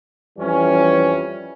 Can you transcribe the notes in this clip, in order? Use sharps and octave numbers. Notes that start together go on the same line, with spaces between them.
F2 E3 G3 C#4